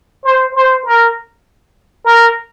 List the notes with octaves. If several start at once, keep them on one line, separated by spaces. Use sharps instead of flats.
C5
C5
A#4
A#4